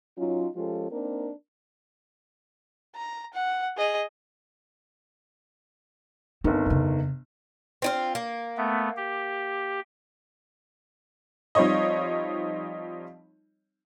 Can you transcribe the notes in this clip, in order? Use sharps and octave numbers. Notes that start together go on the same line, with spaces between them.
F#3 C#4 D#4 F4
F3 G#3 C#4 F4 G4 A4
A#3 C4 D4 D#4 A#4
A#5
F#5
G#4 D#5
G1 D#3 C4
F2 C#3
C4 D#4 F4
A#3
A3 B3
G4
F3 G3 C4 D#4 C#5 D#5